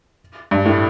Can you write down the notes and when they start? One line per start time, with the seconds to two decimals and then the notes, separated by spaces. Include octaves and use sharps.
0.51 G2
0.65 A2